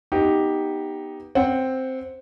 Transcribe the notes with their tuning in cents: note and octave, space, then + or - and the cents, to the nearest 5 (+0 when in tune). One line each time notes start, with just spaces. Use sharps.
B3 -10 D#4 +5 G4 +0
C4 +0 F#5 -5